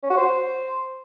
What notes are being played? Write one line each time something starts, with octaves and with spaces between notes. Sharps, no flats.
C#4
F#4
C5